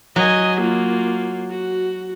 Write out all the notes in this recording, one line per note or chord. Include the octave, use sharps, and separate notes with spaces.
F#3 D#5 G#5
A#3 F4
F#4